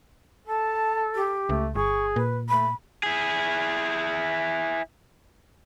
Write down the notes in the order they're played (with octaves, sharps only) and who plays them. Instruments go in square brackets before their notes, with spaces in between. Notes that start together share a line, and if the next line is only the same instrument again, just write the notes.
[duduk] A4 [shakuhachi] A5
[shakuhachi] G4
[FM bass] C#2 [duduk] A3
[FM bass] G1 [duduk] G#4 [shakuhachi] C#6
[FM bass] A#2 [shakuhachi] B4
[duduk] A3 [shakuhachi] B5
[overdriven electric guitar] E4 G#4